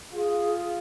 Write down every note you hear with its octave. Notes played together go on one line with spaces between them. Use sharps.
F4 G#4